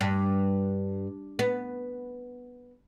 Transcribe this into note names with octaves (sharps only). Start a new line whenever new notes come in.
G2
B3